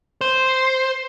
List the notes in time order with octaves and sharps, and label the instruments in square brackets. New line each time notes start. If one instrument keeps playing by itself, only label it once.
[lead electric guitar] C5